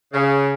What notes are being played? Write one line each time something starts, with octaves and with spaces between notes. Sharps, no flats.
C#3